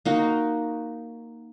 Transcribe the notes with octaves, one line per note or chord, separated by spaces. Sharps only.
A#3 D#4 F#4